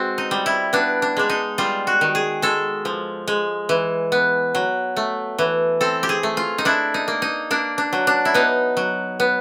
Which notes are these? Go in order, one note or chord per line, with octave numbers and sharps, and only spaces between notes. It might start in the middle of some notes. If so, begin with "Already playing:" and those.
Already playing: G#3 C4 F#4
D#4
G3
E4
B3 D4
D4
G#3 D4
D#4
G3 F4
F#4
D#3
G#4
G#3 A4
F3
G#3
E3
B3
F#3
A3
E3
C4 A4
G4
G#4
A3
F4
D#4
D4 E4
D#4
A#3
D#4
A#3 D4
D4
F#3
D4
E4
B3 D#4
F#3
B3